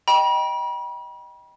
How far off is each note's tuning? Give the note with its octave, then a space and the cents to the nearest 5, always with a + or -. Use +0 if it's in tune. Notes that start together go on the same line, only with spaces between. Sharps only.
D#5 +0 G5 +0 B5 -40